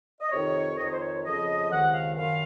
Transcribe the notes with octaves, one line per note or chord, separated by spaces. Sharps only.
D#5
F2 C3 D#3 C#5
F2 D#3 D#5
C#5
C5
C#5
F2 C#3 F3 D#5
C#2 C3 D#3 F#5
F5
F#2 D#3 F5